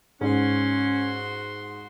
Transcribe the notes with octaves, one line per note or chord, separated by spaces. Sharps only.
G#2 C#4 F#4 C6